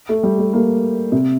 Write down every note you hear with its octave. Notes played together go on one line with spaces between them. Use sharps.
A3
G3
A3
A#3
C3